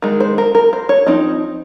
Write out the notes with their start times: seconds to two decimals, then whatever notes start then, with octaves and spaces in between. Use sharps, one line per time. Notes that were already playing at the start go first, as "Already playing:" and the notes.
0.02 D#3 G#3
0.20 C5
0.38 A#4
0.55 A#4
0.73 C5
0.89 C#5
1.06 F3 C4 D#4 D#5